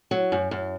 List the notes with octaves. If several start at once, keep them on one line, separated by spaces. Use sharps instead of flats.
F#3
F#2
F#2